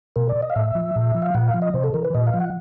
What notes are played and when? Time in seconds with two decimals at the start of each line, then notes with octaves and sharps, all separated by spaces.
0.16 B2 A#4
0.29 D5
0.42 D#5
0.50 F5
0.55 A2 E5
0.75 F3
0.96 A#2
1.14 F3
1.22 F5
1.35 A#2 F#5
1.48 F5
1.54 F3
1.62 D#5
1.74 C3 C5
1.84 A4
1.94 E3 A#4
2.04 B4
2.14 A#2 D#5
2.27 F5
2.34 F3
2.40 F#5